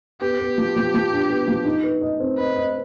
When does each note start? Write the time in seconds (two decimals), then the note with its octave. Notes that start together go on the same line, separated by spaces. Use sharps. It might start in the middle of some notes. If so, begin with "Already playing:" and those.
0.21 B3 G4
0.39 B3
0.58 F3
0.76 F3
0.94 F3
1.12 D4
1.30 B3
1.48 F3
1.65 D#4
1.84 B4
2.01 D#5
2.20 C4
2.38 B4 D#5
2.56 D#5